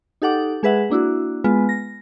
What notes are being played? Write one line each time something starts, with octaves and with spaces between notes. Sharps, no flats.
D#4 G4 A4 F#5 D6
G#3 G#4 B4 E5 F#5
A#3 D4 E4 F#4
G#3 B3 F4 B4
A#6